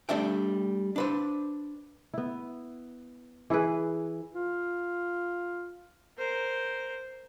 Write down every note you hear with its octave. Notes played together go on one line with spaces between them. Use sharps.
G3 A3 D4 E5 G5
D4 B4 C5
B3 E4
E3 E4 G#4 B4
F4
A#4 C5